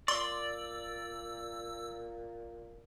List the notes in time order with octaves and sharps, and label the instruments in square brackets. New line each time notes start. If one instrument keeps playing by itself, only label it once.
[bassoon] A#2 [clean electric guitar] D5 [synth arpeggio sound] C6 [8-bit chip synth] E6